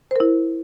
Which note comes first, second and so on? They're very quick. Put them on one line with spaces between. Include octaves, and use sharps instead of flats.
C5 A#4 E4